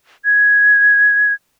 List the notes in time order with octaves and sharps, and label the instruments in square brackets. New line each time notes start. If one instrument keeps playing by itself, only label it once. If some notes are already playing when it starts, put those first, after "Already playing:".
[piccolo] G#6